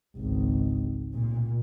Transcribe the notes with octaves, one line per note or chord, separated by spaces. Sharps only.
G#1 C#2
A#2